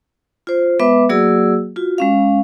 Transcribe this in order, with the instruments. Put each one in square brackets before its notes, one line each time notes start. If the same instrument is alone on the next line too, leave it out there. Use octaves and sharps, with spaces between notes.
[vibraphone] F4 C5
G#3 B3 B4 E5 D6
F#3 A#3 F#4 G#4 D5 E6
F4 F#4
G#3 C#4 F5